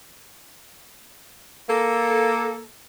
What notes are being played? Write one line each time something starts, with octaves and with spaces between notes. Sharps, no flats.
A#3 A4